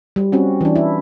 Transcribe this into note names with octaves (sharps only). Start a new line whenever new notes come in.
G3
C4 C#4 F#4
E3 D4
E4